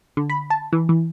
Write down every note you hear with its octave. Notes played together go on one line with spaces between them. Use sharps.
D3
B5
A5
E3
E3